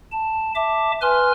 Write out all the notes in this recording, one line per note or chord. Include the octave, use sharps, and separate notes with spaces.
A5
E5 A5 D6
B4 G#5 C6 F6